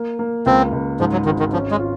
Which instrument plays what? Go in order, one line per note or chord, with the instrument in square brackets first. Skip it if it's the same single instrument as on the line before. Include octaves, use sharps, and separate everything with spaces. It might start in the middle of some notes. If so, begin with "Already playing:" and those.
Already playing: [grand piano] A#3
A#3
[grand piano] C#2 [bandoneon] C4
[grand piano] C#2
[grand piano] G#2 [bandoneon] F3
[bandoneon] F#3
[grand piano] G#1 [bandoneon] D#3
[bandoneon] D#3
[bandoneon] F3 [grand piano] C#4
[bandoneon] G#3
[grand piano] F4